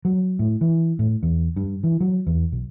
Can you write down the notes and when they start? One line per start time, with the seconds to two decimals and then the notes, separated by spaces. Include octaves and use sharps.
0.05 F#3
0.39 A2
0.61 E3
0.99 A2
1.23 E2
1.57 G2
1.84 E3
2.01 F#3
2.27 E2
2.52 B1